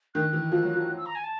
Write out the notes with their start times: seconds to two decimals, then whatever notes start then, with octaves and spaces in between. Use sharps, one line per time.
0.14 D#3 F#6
0.33 E3
0.52 F3
0.63 F#3
0.76 F3
0.97 E6
1.06 A#5
1.15 G#5
1.24 A5